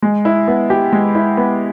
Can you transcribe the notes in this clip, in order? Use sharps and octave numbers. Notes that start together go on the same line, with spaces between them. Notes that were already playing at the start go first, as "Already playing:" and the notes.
G#3
E4
B3
G4
G#3
E4
B3